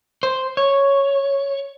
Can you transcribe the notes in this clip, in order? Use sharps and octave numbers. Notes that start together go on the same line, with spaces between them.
C5
C#5